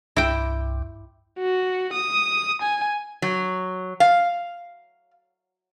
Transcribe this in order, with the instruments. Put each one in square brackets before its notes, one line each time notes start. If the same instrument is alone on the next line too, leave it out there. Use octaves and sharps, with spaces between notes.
[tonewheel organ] C2 G2 [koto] E4 G5
[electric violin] F#4
D#6
G#5
[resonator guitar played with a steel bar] F#3
F5